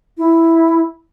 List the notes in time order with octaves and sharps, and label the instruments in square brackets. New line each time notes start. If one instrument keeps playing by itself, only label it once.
[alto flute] E4